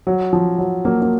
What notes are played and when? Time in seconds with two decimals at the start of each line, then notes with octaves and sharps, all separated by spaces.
0.07 F#3
0.33 F3
0.58 F#3
0.85 F#3 A#3
1.02 A#3